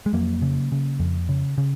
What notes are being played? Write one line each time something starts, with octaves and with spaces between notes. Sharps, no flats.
G#3
F2 F#3 A#3
C#3
C#3
F2
C#3
C#3